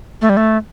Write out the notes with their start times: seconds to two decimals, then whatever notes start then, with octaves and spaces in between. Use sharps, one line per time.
0.22 A3
0.29 G3
0.37 A3